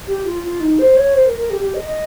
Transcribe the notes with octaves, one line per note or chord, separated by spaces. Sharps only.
G4
F4
F4
D#4
C5
C#5
C5
A#4
A#4
G4
G4
D#5
D#5